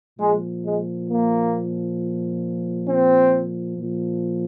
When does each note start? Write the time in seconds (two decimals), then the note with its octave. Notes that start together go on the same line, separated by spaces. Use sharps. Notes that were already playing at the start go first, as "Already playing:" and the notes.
0.18 A#2 F3 G#3
0.64 G#3
1.08 A#3
2.88 C4
3.78 A#2 F3